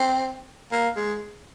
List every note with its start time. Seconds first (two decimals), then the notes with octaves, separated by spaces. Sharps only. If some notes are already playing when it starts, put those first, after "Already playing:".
Already playing: C4
0.71 A#3
0.96 G#3